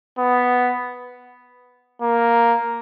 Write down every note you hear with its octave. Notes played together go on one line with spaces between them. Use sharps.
B3
A#3